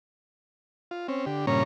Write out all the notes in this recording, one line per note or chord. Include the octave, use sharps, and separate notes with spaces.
F4
C4 C#4
D3 G4
G2 A#2 C#3 C#4 C#5 A#5